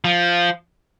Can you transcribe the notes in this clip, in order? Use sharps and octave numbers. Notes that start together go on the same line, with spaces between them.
F3